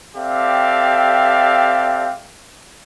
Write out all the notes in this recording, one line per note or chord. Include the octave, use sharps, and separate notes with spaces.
C4 G4 A4 D5 E5 F5